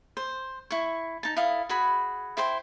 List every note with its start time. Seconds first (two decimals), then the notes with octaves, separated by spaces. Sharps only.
0.17 C5
0.71 E4 C#6
1.23 D#4 A5
1.37 E4 A4 F5 D#6
1.69 F#4 G#4 B5
2.37 E4 C5 G5 C6